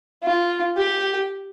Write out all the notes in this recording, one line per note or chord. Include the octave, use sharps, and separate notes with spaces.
F4
G4